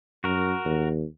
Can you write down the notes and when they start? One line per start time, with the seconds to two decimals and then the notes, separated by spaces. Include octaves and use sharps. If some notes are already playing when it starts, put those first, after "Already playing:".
0.24 F#2 F#4 A#4
0.65 D#2